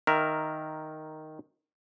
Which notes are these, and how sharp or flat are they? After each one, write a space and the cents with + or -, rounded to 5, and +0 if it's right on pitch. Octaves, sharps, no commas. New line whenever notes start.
D#3 +0 A#4 +0 E5 +20